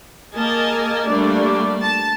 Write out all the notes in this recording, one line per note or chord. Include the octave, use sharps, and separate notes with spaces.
A#3 G#4 A#4 D#5 G#5 A5
G3 A3 A#3 D4 D5
A5